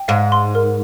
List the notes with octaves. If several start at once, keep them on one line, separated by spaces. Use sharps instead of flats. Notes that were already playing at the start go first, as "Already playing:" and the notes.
Already playing: G5
G#2 F5
C6
A#4